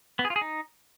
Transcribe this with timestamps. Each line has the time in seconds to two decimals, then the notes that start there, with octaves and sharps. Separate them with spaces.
0.19 B3
0.25 G#4
0.30 F4
0.36 G#4
0.41 D#4